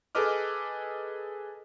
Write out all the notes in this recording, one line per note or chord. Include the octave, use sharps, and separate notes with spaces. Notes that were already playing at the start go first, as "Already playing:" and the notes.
G#4 A4 B4 D#5 D6 F6